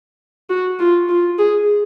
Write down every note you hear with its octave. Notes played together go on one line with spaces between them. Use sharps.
F#4
F4
F4
G#4